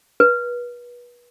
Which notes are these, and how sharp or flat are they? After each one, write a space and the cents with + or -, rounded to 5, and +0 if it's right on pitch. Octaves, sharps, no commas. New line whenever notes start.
B4 -30